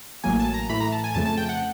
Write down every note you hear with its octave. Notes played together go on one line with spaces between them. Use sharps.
A1 A2 F#3 A#3 G#5
A5
A#5
A2 E3 A3 B5
A#5
A5
G#5
F2 C#3 F3 A3 A5
A5
G5
F#5